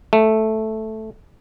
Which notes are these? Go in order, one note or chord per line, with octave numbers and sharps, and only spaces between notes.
A3